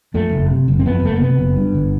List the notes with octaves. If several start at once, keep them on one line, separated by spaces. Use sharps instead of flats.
F2 A3
F#1
C3
F#1
C4
F2 B3
F#1 A3
A#3
C3 B3
F#1
G2
G1